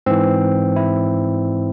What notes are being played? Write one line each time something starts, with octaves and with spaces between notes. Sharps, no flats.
G#2 E3 C4
E4